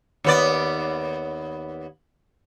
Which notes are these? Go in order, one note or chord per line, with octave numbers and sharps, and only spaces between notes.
D#2 B3 D5